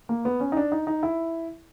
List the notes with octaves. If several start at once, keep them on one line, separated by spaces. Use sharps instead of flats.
A#3
B3
C#4
D#4
D4
D#4
D#4
E4